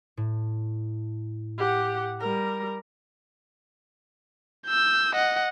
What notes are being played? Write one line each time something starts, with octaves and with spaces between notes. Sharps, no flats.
A2
G4 F#5
G3 A#4 A#5
E6 G6
D#5 F#5